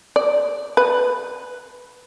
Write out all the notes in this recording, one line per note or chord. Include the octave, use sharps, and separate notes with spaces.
D5
B4